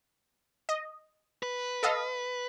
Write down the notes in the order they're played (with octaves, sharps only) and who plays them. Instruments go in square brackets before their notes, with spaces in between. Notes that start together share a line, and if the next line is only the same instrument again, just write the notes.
[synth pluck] D#5
[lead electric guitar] B4
[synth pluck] A4 D#5 F5